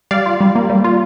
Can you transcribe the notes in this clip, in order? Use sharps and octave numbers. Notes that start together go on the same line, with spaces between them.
G3 D5 F5
F4
G3
A#3
G3
F4